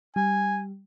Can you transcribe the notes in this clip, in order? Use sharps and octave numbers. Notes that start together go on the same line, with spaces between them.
G3 G#5